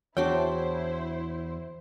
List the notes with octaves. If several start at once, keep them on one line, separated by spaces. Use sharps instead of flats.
E2 D4 E4 F#4 C5 C#5 G5